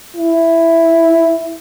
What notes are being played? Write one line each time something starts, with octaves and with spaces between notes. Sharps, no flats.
E4